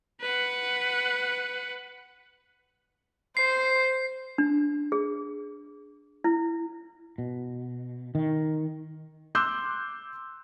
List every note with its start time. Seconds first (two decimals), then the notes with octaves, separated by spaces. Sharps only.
0.21 B4 F#5
3.37 C5 C7
4.38 D4
4.92 G#4
6.24 E4
7.18 B2
8.15 D#3
9.35 C6 D6 E6 F#6 G6